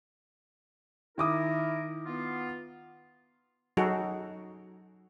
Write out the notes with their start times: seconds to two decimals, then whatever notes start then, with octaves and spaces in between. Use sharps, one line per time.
1.18 D#3 E4 A#4 D6 D#6
2.06 B3 F4
3.77 F#3 D#4 F#4 G#4 A4